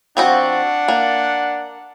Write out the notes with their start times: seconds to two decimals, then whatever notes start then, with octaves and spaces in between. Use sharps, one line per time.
0.17 F3 C4 D4 F#4 F#5
0.88 A#3